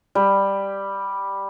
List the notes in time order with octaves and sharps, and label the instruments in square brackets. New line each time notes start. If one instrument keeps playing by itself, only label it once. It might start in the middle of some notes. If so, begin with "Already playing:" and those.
[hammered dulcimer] G3